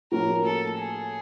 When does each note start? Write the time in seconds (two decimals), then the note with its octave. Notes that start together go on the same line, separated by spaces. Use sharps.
0.11 A2 F3 A#3 C#4 F#4 A#4
0.45 A4
0.78 G#4